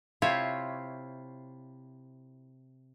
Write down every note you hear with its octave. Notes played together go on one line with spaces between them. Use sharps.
C3 E4 F4 C5 C#5